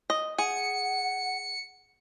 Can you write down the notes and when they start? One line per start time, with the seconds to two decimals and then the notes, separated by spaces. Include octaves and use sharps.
0.10 D#5
0.38 G#4 F#5 C#7